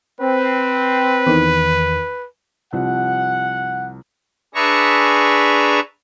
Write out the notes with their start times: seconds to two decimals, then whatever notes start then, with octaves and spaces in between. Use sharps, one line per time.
0.20 C4 B4
1.27 E2 D#3
2.73 C2 F3 F#5
4.55 D4 G#4 B4 E5 A#5 C#6